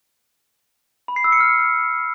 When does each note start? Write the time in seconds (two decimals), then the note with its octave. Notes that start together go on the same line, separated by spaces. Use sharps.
1.08 B5
1.16 C7
1.24 E6
1.32 C#7
1.40 F6